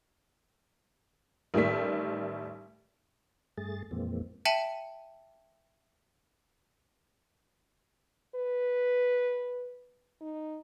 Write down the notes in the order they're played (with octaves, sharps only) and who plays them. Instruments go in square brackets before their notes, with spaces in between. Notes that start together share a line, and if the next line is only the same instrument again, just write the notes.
[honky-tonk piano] A1 D#3 G3 A3 B6
[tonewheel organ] G2 A3 G#4 A6
F2 A#2 E3 G#3 A#3 C4
[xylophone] E5 G5 A5 C#7 D#7 F#7
[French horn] B4
D#4